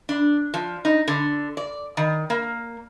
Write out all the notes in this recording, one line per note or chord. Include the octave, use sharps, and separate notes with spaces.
D4
F3
D#4
D3
D5
D#3
A#3